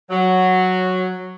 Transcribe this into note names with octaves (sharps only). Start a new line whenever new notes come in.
F#3